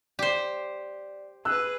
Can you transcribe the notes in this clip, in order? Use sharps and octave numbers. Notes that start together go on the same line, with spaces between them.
G4 C5 D5
G#4 B4 E6 F#6